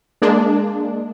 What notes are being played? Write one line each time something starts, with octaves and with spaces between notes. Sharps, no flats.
G#3 A#3 D4